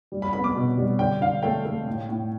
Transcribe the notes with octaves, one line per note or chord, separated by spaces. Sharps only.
G3
B5
B3 B5
D6
B2
G3
D3 G5
D3 F5
A3 G5
A3
A2
A2